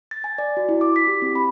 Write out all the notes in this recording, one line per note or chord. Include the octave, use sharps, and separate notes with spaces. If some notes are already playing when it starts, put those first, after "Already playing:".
A6
G#5
D5
F#4
E4
D6
B6
G4
C4
B5